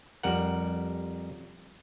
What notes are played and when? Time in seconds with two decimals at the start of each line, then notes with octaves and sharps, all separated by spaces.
0.23 F2 G3 A#4 F#5